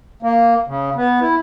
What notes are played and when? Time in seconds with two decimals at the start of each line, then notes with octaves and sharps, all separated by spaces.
0.23 A#3
0.68 C#3
0.96 B3
1.21 E4